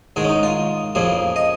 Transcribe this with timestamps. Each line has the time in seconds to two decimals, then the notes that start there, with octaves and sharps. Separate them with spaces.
0.16 G#2 D#3 G#3 G#4
0.24 C#4
0.29 D#4
0.43 F4
0.95 F2 C#3 F3 A#3 G#4
1.36 D#5